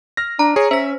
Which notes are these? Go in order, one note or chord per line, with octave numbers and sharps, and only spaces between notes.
F6 A#6
D4 A#5
G#4 C#5
C#4 C5 E5 B6